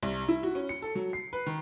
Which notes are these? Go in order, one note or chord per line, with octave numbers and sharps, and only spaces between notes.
C2
E4
F#4
C#4
C#7
A4
F#3
C7
B4
D#3